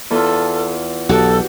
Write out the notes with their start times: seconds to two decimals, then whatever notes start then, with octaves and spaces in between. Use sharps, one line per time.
0.10 E2 F4 A4
1.09 B1 F#4 G4 A4